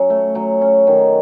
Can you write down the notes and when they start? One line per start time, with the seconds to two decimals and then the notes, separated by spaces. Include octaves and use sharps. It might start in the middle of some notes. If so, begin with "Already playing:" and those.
Already playing: F#3 C#4
0.10 A3
0.35 F#3
0.62 C#4
0.87 D#3